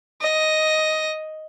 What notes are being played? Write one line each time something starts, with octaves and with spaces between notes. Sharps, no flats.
D#5